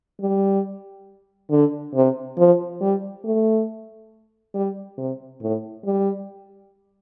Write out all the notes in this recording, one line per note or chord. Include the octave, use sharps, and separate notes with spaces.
G3
D3
C3
F3
G3
A3
G3
C3
A2
G3